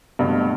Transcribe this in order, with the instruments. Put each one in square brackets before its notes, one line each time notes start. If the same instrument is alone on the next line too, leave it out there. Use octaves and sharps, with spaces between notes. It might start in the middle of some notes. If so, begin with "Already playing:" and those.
[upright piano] G2 B2 [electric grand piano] D3 F#3 A3 C4